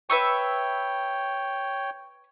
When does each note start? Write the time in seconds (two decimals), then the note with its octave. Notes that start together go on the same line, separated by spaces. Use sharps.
0.10 B4 C#5 E5 G5 C#6